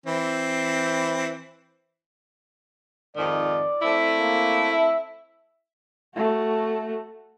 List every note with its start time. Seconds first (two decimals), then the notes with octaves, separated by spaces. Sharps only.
0.06 E3 C4
3.16 F2 G#2 D#3 D5
3.82 A3 C4 E4
4.19 A#3
4.71 E5
6.15 A3 F#4